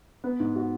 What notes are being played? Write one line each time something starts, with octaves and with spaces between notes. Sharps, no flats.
B3
G#2
F#4